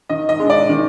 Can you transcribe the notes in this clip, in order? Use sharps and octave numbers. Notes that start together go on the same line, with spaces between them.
D#3 D#5
D#5
G#3 D4
D5
D#3